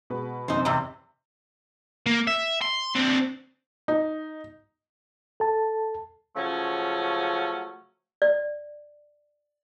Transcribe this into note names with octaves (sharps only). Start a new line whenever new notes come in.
B2 G#3 B4
F#2 C3 E3 D#4 C5
E2 G#2 C3 D6 E6
A#3
E5
C6
D3 C4
D#4
A4 A5
C#3 F3 F#3 A3 C#4
D5